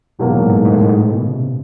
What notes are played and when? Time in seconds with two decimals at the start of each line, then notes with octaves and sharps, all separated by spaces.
0.19 E2 G#2 B2 F#3 A#3
0.27 A2
0.34 G#2
0.42 A2
0.49 G#2
0.57 A2
0.65 G#2
0.73 A2
0.81 G#2
1.00 A2
1.10 B2
1.21 C#3
1.31 C3